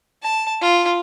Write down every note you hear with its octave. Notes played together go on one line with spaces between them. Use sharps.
A5
F4